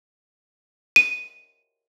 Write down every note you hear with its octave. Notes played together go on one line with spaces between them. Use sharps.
D#7